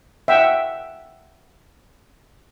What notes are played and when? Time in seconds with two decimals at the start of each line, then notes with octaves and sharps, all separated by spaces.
0.28 E5 F#5 G5